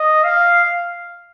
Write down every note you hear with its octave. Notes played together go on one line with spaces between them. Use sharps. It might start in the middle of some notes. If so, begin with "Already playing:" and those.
Already playing: D#5
F5